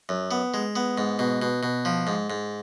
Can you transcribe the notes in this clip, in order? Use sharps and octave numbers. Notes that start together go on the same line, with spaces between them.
F#2
B3
G#3
B3
G#2
B2
B2
B2
F3
G#2
G#2